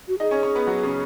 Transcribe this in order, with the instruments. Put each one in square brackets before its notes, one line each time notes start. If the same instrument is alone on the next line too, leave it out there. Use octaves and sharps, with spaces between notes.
[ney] F#4
[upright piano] D#4 D#5 [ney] G#4
[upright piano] C#4 C#5
C#4 C#5
B3 B4
F#3 F#4
C#3 C#4